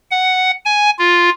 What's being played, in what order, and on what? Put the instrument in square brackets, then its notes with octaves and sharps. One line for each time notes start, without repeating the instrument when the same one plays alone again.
[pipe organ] F#5
G#5
F4